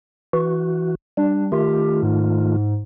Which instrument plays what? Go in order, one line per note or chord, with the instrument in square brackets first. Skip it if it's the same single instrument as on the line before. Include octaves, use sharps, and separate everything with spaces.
[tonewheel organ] E3 F#4
[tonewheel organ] G3 [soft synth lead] D4
[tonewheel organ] D#3 A3 F4 [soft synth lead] G4
[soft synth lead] G#2